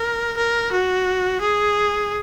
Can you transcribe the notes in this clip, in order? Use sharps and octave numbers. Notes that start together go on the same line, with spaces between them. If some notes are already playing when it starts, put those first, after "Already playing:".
Already playing: A#4
A#4
F#4
G#4